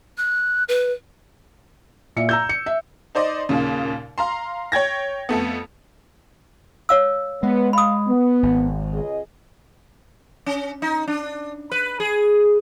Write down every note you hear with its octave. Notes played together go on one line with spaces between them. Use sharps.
F#6
B4
A#2 E5 C#7
A#5 E6 G6
C#7
E5
D#4 C5 D5 D#5
D#2 A#2 C#3
F5 A#5 C6
C#5 G5 G#6 A#6
F2 A3 B3
C#5 F5 E6
G#3 B3
F5 B5 D#6
B3
G#1
C#2 G#4 D#5
C#4
D#4
D4
B4
G#4